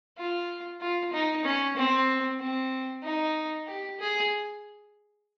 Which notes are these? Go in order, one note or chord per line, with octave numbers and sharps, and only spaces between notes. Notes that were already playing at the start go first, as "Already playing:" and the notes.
F4
F4
D#4
C#4
C4
C4
D#4
G4
G#4